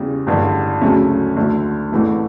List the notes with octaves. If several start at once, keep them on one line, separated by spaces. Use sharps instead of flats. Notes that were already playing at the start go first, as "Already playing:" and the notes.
Already playing: E2 C#3 G3
A1 G2 D3 G3
D2 C#3 F#3 A3 C#4
D2 D3 A3
A1 A2 E3 A3